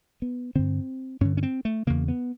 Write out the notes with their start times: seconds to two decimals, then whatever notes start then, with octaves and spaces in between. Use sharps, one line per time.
0.22 B3
0.55 G2 D3 C4
1.21 G2 D3 C#4
1.37 C#4
1.43 C4
1.65 A3
1.87 E2 C#3 A#3
2.08 B3